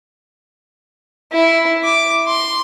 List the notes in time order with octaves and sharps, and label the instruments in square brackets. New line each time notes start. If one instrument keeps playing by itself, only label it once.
[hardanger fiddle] E4
D6
C6